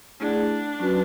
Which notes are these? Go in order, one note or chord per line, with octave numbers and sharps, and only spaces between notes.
A3 D4 E4 G#4 D5 F#5
F#3 C#4 F#4 B4